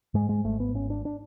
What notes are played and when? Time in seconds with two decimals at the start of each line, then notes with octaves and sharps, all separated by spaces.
0.14 G#2 G#3
0.29 G#3
0.44 G#1 A3
0.60 B3
0.74 G#1 C#4
0.90 D4
1.05 D4